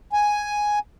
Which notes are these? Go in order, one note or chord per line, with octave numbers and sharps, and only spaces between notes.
G#5